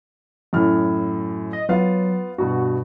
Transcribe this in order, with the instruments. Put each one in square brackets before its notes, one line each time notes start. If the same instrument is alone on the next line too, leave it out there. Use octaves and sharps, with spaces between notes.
[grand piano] F#2 A2 F6
[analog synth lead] D#5
[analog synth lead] F#3 [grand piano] B3 F4 F5
[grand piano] G2 B2 [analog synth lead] F#4